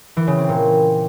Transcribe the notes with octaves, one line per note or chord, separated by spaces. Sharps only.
E3
C#3
C4
A#2